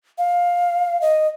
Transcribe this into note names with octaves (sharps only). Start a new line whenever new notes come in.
F5
D#5